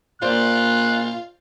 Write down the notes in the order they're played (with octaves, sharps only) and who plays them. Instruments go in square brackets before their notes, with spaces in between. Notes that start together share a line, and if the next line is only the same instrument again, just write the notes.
[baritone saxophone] A#2 [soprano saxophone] F4 [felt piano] C5 D5 [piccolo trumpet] F#6